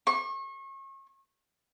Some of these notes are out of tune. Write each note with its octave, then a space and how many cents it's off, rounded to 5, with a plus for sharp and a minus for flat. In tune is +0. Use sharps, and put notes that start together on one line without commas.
C#6 -35